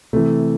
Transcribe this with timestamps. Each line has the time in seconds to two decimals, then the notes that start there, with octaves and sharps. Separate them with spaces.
0.13 C3 E3 A3